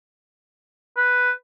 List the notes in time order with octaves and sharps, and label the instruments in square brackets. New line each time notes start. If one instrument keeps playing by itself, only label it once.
[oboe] B4